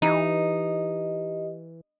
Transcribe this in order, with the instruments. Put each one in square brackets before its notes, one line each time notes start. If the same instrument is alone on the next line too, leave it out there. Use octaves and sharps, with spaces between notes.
[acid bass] E3 [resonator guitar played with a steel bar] D#4 [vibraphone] G4 D#5